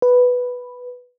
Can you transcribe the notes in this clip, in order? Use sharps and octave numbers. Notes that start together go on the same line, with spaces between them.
B4